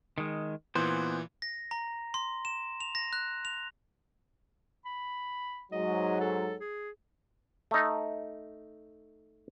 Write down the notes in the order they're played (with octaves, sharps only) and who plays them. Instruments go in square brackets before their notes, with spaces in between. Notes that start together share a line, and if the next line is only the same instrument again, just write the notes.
[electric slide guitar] D#3 G#3
[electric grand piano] A#2 E3 [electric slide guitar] B3 C5
[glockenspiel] A#6
A#5
C6
E7
F7
A#6
F#6
F7
[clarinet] B5
[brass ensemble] G#2 F#3 [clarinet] D#5
[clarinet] A4
G#4
[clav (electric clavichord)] A3 D#4